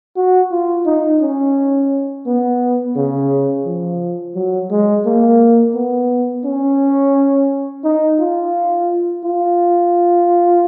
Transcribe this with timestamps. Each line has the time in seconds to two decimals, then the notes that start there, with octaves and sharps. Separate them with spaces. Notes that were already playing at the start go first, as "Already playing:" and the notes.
0.16 F#4
0.51 F4
0.86 D#4
1.20 C#4
2.26 B3
2.96 C#3
3.65 F3
4.35 F#3
4.71 G#3
5.06 A#3
5.74 B3
6.45 C#4
7.84 D#4
8.19 F4
9.24 F4